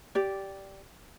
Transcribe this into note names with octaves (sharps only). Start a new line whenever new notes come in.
G4 D5